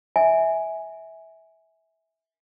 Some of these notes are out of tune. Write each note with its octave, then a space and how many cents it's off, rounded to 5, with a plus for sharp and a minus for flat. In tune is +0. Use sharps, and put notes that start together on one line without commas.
E5 -20 G#5 +0